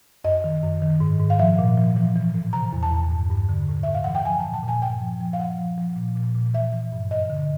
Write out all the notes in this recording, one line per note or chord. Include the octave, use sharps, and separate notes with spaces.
F#2 D#5
D#3
F#2
D#3
G#2
G#2
F5
F3 E5
A#2
F3
E3
E3
A2
C3 A#5
E2
A5
E2
G2
G2
D3
A2
A2 E5
F5
E3 F#5
G5
F3 G#5
A#2 A5
A5
A#2
G#5
G2 G5
F3
F3
F5
F3 F#5
F3
F3
A#2
A#2
A#2
E3 E5
E3
G2
F#2 D#5
D3